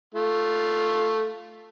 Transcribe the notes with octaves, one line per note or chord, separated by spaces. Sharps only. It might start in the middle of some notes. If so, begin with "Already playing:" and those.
A3 F4